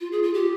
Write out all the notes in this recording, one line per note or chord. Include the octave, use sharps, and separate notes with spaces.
F4
G#4
F4
G4